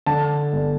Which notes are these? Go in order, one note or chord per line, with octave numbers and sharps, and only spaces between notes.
D3 A5
G1